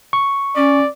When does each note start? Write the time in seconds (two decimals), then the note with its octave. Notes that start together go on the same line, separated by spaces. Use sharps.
0.13 C#6
0.56 C#4 D5